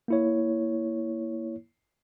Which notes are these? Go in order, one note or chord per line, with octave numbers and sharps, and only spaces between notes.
A#3 E4 C#5